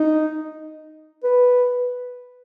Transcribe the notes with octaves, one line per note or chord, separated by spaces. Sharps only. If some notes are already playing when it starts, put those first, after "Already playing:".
Already playing: D#4
B4